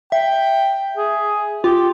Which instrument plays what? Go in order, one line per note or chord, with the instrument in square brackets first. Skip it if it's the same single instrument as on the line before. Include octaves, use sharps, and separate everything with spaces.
[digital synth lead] E5 [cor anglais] G5
[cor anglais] G#4
[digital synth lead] F4 [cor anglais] G4